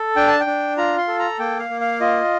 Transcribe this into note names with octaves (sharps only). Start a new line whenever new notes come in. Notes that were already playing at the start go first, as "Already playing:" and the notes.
Already playing: A4
D4 G5
A5
G5
D4
F4 A#5
C6
A4
A#5
A#3 G5
F5
A#3
F5
F4 D#5